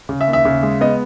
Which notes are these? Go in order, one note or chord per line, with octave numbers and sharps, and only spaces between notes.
C#3
E5
D#2
E5
C#3
G#3
B3 D#5